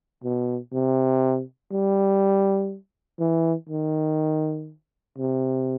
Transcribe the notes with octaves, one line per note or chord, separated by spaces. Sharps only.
B2
C3
G3
E3
D#3
C3